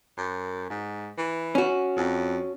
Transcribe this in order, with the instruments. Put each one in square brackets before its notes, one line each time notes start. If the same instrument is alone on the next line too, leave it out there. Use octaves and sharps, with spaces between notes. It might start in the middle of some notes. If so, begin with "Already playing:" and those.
[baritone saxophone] F#2
G#2
E3
[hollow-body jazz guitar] C#4 F#4
[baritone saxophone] F2